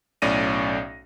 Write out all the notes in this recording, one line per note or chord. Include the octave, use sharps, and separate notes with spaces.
B1 A2 C#4 D5 A#6 D#7